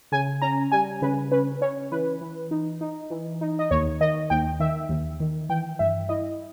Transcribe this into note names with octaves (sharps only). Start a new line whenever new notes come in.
C#3 G#5
C#4 A#5
G3 G#5
C#3 B4
C#4 B4
C#4 C#5
E3 B4
E3
D#4
D#4
E3
D#4
D#5
D#2 C#5
D#3 D#5
D#2 G5
D#3 E5
D#2
D#3
E3 G5
G2 E5
E4 D#5